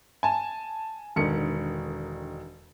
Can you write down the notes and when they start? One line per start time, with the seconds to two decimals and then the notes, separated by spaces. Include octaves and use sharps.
0.23 G#5 A5
1.16 E1 D3 D#3 C#7